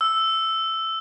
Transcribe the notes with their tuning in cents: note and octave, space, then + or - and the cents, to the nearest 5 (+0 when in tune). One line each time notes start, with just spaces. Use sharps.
E6 +0